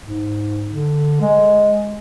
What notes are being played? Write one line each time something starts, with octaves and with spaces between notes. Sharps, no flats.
G#2
D3
G#3